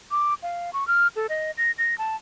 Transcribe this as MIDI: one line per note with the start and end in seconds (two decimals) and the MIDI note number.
0.11 0.34 86
0.43 0.73 77
0.73 0.86 85
0.88 1.08 89
1.16 1.27 69
1.29 1.51 75
1.58 1.71 94
1.78 1.98 94
1.98 2.16 81